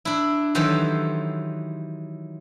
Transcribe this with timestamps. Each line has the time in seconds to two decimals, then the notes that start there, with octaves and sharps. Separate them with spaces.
0.05 D4 E4
0.55 D#3 E3 F#3 G4 A4 C5